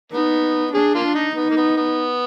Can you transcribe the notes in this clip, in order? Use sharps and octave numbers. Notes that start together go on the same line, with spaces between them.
B3 D#4
D4 G#4
A#3 F4
D4
D#4
B3 D#4
A#3
B3
B3